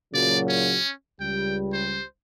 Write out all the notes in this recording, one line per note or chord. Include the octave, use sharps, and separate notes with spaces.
A#2 C#3 F#3 D5
C#4
C#2 G3 G5
C5